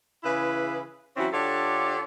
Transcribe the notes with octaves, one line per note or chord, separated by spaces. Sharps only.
C#3 E3 E4 G#4 B4
E3 F#3 C4 C#4 E4 F#4
D3 D4 F4 G4 A4 C#5